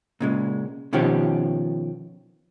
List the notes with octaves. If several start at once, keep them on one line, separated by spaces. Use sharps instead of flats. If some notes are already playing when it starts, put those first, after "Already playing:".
A#2 C#3 G#3
B2 D#3 F3 C#4 G4